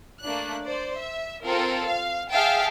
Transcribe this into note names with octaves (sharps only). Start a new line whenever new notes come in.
A3 A#3 D4 F#6
C5 D5
E5
C4 F4 A4 A#4
F5
G#4 E5 F5 G5 A5